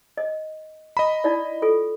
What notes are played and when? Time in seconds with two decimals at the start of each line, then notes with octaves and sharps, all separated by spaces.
0.17 D#5
0.97 D#5 A#5 B5
1.24 D#4 E4 D5
1.62 F4 A4